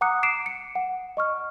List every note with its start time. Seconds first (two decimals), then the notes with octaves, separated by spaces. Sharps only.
0.01 F#5 A#5 D6 D#6 F#6 C#7
0.23 D6 C7 D7 E7
0.46 C#7
0.75 F#5
1.17 D#5 C#6 F6